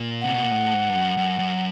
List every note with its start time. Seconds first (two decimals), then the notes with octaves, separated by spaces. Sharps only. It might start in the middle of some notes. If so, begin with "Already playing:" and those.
Already playing: A#2
0.21 C3 F#5
0.34 B2
0.43 A#2
0.51 A2
0.74 G#2
0.89 G2
0.95 F#2
1.17 F#2
1.39 F#2